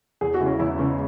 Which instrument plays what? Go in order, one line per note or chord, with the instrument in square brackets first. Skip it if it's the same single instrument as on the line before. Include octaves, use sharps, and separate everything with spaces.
[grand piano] E2 [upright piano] G#4
[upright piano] F#4
[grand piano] C#3 E3 G#3 E4
[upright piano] C#4
[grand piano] E2 [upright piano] E4
[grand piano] C#3 E3 G#3 E4 [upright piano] C#4